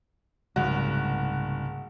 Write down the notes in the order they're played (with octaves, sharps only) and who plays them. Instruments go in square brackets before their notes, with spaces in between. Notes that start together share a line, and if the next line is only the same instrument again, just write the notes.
[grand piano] F#1 F#4 [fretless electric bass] C2 G#2